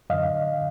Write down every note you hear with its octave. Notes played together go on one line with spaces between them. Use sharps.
F#2 D3 D#5 F5